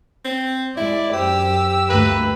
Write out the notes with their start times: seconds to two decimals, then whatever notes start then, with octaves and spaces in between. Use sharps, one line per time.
0.25 C4
0.77 G#3 E4 D5
1.13 F#2 G4 C5 E6
1.89 D2 G2 A3 A#3 B4